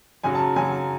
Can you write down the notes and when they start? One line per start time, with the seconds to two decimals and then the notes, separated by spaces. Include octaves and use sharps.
0.23 F#2 C#3 F#3 G#5
0.35 A5
0.56 F#2 C#3 F#3 G#5